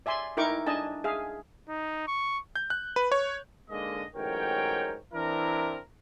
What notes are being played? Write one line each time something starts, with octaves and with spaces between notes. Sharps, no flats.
D5 E5 G#5 C6
D#4 E4 A#4 G5 C#6 D6
D4 D#5 G#5 A5
G#4 E5 F5
D#4
C#6
G6
F#6
B4
C#5
G#2 D3 G#3 A#3 D#5
A1 G#2 F#3 A#4 C#5 G5
E3 C4 D4 E4 A#4